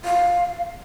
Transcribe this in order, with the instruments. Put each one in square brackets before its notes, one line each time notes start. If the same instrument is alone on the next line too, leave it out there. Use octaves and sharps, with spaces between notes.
[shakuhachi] F5